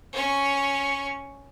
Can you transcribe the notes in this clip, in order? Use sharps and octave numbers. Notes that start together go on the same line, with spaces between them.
C#4 C#6